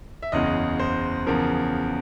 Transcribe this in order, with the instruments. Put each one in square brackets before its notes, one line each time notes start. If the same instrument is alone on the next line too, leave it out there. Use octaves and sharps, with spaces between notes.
[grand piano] E5
F#1 E2 C#3 D#5
C5
E2 C#3 F3 A#4